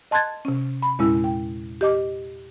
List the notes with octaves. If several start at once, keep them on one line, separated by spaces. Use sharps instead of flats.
D#5 A5 C6 F#6 G#6 A6
C3 C#4
B5
E2 A#2 G#3 C#4 E4
G5
G4 D#5 D6